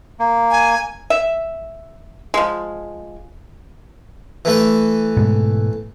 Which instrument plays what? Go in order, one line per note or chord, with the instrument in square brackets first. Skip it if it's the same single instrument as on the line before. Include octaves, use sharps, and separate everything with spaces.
[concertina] A#3
[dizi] G#5
[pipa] E5
F3 G#3
[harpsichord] E3 A3 B4
[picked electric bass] G#2 B2 G#3